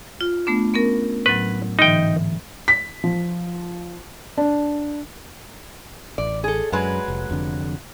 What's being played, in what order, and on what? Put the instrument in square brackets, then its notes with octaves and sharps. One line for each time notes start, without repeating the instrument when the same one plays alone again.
[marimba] F4
A3 B3 D4
B3 C#4 A#4
[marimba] A2 F#3 [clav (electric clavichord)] B4
[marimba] G#2 D3 E3 [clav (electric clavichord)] D#4 G5
[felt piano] B6
F3
D4
[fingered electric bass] A1 [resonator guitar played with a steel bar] D5
[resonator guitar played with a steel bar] G#4 A4
[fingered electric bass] F#2 [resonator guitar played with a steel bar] F#3 G#3 B4
[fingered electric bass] F1
F1 F2 D3